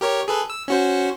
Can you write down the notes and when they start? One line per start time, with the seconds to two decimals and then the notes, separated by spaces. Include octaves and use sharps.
0.01 G4 A#4 C#5
0.28 G#4 A4 B4
0.50 E6
0.68 C#4 F#4 C5